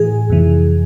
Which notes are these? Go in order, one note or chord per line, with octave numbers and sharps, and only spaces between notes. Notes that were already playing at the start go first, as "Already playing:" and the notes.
Already playing: A2 E3 G#4
F2 C3 E3